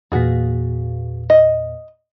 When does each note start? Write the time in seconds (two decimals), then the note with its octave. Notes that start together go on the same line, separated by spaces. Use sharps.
0.12 E2 A#2 F#4 G#4
1.30 D#5